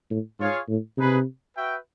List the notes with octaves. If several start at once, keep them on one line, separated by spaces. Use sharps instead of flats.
A2
G#2 F4 G#4 C#5 F5
A2
C3 D#4 G#4 B4
F#4 B4 E5 G5